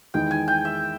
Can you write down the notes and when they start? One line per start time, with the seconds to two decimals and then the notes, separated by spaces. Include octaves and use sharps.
0.14 E2 D#3 G#3 D#4 G5
0.31 G#5
0.48 G5
0.65 E5